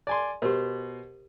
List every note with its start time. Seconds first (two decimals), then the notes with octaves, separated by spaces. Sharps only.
0.07 D5 G#5 C6
0.42 B2 G4 A#4 C5